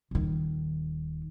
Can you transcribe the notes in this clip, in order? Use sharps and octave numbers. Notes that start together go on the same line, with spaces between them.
D#1 D#3